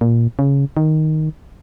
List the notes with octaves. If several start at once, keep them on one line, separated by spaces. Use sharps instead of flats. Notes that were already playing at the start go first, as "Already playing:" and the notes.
A#2
C#3
D#3